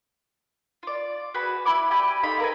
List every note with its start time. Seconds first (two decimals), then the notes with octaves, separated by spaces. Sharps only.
0.83 F4 D5
1.34 F#4 G#4 B4 B5
1.65 E4 B5 D6
1.91 G4 D5 G5 G#5
2.23 D#4 F4 A4 B5
2.40 A#4 B4 G#5